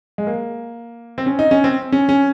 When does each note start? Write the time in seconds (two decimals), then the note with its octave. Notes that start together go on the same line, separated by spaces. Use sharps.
0.18 G#3
0.27 A#3
1.18 C4
1.26 C#4
1.39 D#4
1.51 C#4
1.64 C4
1.92 C#4
2.09 C#4